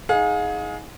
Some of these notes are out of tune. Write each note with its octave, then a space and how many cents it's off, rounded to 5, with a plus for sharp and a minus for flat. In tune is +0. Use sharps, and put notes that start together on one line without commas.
D#4 +30 G#4 +15 F5 +45